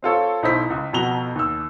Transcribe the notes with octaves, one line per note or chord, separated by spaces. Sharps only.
C4 F4 A4 C#5
B1 D#4 E4 C5 B6
C#2
F2 B2 F#4 A#5 F7 G7
D#2 E6